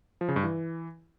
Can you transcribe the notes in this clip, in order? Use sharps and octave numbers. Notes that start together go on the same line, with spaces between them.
F3
C#3
G2
E3